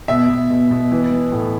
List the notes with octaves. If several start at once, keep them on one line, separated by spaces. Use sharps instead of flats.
B2 E5
B2
B2
B2
E3
E3
A2